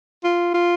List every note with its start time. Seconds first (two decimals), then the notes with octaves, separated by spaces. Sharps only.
0.24 F4
0.54 F4